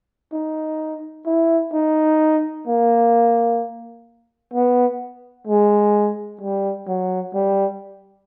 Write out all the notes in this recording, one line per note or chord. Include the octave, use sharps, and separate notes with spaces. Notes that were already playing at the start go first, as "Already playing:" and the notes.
D#4
E4
D#4
A#3
B3
G#3
G3
F#3
G3